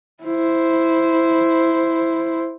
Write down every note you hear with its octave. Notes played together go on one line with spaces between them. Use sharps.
E4 C5